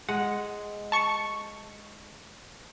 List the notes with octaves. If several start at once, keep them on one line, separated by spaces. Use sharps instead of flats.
G#3 F#5
A5 C#6 C#7